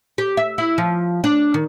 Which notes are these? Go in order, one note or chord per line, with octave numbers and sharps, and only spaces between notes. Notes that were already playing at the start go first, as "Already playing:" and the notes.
G4
E5
E4
F3
D4
D#3